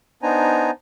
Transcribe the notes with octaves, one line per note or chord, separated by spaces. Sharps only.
B3 D4 D#4 C5 G#5 A#5